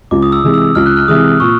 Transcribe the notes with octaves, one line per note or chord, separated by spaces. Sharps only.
C#2 D6
D#6
E6
C3 E3 G#3
E6
C#2 F6
F#6
F6
C3 E3 G#3 D#6
A#2 C#6